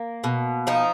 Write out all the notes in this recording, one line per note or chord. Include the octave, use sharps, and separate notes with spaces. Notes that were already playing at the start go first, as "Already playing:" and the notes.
Already playing: A#3
B2
F3 D#4